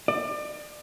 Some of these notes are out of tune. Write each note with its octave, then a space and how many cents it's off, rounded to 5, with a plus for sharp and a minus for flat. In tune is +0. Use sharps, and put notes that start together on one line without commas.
D5 +30